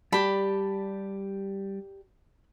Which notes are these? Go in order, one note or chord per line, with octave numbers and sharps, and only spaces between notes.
G3 G4 D5 A5 B5